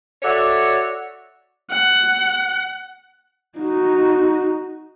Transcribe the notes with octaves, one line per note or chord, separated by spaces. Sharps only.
F#4 A4 C#5 D5 E5
F#5
D#4 F#4